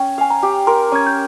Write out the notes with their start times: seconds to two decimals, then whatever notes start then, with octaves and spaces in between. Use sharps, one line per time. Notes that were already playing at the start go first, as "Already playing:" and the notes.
Already playing: C#4 G5
0.18 F5 G#5
0.30 A#5
0.43 G4
0.67 A#4 C6
0.92 C#4 G#6
1.06 G6